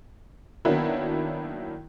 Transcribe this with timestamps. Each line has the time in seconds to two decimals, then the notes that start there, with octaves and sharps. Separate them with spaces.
0.65 D#3 F#3 A#3 B3 D4 E4